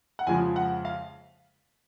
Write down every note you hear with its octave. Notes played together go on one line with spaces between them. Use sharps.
F#5
F2 C#3 F3 G#3 G#5
F#5
F5